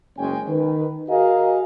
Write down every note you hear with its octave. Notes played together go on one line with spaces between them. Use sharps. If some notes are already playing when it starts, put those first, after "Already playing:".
F#1 G#3 C#4 G5 G#5
D#3 B4
F#4 G#4 A#4 D#5 F5